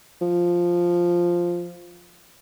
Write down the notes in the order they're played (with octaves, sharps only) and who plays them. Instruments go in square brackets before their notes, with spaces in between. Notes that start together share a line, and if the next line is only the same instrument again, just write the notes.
[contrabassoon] F3